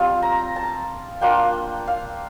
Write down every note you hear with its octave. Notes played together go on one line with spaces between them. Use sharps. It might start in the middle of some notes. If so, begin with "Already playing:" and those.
Already playing: G3 C4 F4
A#5
A5
A#3 D4 F4 G5
F5